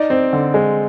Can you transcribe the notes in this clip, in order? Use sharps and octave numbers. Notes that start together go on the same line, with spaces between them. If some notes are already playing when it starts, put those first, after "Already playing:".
Already playing: D#4 D5
C4
D3
G#3